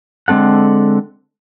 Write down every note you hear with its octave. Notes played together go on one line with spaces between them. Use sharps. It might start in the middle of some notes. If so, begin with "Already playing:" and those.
D3 G#3 C4 A4 F#5